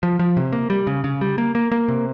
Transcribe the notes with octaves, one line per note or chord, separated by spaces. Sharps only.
F3
F3
C3
A#3
G3
C#3
C#3
G3
A#3
A#3
A#3
C3